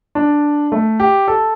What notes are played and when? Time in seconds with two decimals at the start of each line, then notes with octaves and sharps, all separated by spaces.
0.15 D4
0.72 A3
1.00 G4
1.28 A4